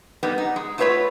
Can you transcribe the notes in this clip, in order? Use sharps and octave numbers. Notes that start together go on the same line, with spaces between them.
G3 A#3 B3 D#4
D#4
G#3
A3 E4 F4 B4 C#5 E5